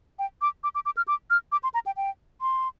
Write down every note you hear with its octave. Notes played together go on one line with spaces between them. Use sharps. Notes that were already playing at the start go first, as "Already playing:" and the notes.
G5
D6
D6
D6
D6
F6
D6
F6
D6
C6
A#5
G5
G5
C6